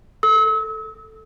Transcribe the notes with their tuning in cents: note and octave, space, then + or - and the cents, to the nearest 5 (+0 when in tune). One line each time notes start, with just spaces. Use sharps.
A4 +0 E6 -40